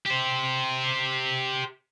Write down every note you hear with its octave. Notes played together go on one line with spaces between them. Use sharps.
G4 C5